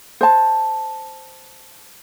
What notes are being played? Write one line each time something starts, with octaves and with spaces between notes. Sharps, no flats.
C5 A5